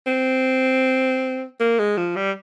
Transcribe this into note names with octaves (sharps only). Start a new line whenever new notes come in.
C4
A#3
G#3
F3
G3